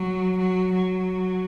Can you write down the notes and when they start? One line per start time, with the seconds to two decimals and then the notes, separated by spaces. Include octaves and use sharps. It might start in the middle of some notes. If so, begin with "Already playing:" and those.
Already playing: F#3
0.38 F#3
0.73 F#3